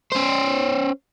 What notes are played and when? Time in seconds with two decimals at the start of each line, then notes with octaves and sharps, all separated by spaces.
0.12 C#4 C5